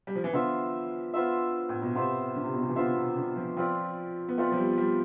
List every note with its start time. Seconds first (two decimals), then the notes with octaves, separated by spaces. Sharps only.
0.07 G3
0.15 F3
0.24 E3
0.33 D3 B3 F4 C5 E5
1.14 B3 F4 C5 E5
1.69 A2
1.82 B2
1.95 C3 B3 F4 C5 E5
2.36 D3
2.44 C3
2.54 B2
2.63 C3
2.69 E3
2.76 D3 B3 F4 C5 E5
2.95 B2
3.17 D3
3.36 F3
3.57 F3 C4 F4 B4 D5
4.28 B3
4.38 A3 C4 F4 B4 D5
4.52 F3
4.57 G3
4.78 G3